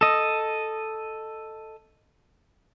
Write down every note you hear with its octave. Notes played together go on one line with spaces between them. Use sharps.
A4 D#5